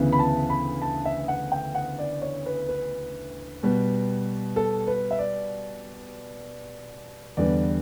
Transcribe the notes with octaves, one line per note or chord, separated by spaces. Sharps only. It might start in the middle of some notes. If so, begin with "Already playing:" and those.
Already playing: D2 C#3 E3 B3
B5
A5
B5
A5
E5
F#5
G5
F#5
D5
C#5
B4
B4
B2 G3 B3
A4
B4
E5
D5
E2 D3 G3 B3 D5